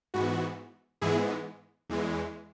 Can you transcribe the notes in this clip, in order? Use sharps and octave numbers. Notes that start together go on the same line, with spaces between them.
G#2 E3 B3 F#4
G#2 E3 G#3 B3 E4 G#4
E2 E3 G#3